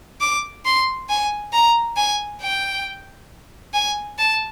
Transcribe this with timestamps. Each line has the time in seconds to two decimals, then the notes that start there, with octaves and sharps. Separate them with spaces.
0.21 D6
0.65 C6
1.09 G#5
1.53 A#5
1.97 G#5
2.41 G5
3.74 G#5
4.18 A5